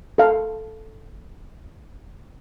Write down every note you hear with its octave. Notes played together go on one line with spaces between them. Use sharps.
A4 F5